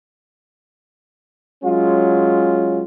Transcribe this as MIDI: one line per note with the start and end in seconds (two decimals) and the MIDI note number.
1.64 2.84 54
1.64 2.84 56
1.64 2.84 61
1.64 2.84 65